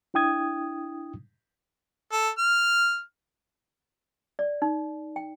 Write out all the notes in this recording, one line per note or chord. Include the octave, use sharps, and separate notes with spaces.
D4 E4 G5 D#6 G#6
A4
F6
D5
D#4
G5